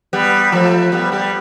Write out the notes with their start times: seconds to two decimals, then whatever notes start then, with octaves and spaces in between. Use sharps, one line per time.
0.13 G3 B3
0.52 F3 A3
0.92 G3 B3
1.12 G3 B3